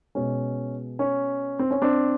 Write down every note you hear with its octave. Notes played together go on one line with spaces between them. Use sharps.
B2 G#3 C#4
C#4
C4
C#4
C4 D4